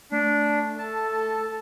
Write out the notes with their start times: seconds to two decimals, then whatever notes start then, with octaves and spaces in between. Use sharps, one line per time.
0.12 A3 D4
0.79 A4 A5